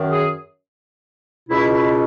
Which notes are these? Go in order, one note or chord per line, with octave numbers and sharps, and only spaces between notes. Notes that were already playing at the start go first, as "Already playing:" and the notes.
Already playing: F#2 D#3
G#4
C#2 B2 E4
E4